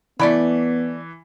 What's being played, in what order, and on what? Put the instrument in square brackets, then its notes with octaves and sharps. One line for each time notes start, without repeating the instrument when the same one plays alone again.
[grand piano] E3 [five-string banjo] A3 D5 B5 [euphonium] B3